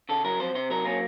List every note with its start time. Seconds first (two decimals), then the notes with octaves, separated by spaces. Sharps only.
0.09 C#3 A4
0.24 F#3 A#4
0.39 F2 C5
0.55 C3 C5
0.70 F#3 A#4
0.85 A#3 C#4